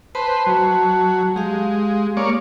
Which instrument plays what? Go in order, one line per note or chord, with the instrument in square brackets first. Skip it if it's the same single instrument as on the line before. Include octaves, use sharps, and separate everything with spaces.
[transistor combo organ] B4 C5 [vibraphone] A5
[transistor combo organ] F#3
[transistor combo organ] G#3 [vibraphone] G4 F5
[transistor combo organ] A#3 C#5 D5